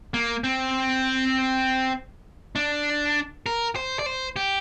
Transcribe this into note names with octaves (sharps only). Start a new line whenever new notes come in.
A#3
C4
D4
A#4
C5
D5
C5
G4